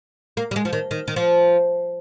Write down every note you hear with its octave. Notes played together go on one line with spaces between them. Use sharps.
A#3
G3
G#3
F3
D#3
D#3
D#3
F3